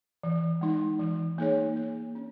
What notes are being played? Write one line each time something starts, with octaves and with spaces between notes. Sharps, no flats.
E3
G#3 D#4
E3
A#3 D#4 G#4 C#5
A#3
C#4